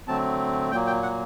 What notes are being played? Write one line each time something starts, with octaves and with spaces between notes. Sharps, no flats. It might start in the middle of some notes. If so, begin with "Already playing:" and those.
D3 F#3 A3 C4 A5
A#2 F#3 A#3 G5
G5
F#5